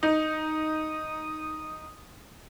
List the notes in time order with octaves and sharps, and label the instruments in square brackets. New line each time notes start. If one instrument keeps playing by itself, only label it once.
[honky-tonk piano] D#4 [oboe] D#6